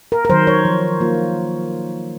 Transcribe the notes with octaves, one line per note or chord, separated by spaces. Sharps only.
A#4
A#4
D#3 F#3 C5
C#5
F3
A#3 F4